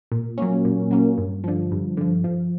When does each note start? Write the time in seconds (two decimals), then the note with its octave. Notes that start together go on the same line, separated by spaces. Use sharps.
0.12 A#2
0.38 F#3 A#3 C#4
0.65 A#2
0.91 F#3 A#3 C#4
1.18 G2
1.44 D3 F3
1.71 G2
1.97 D3 F3
2.24 F3